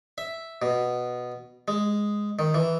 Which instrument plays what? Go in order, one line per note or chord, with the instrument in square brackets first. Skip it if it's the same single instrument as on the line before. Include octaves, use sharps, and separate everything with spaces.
[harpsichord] E5
B2
G#3
D#3
E3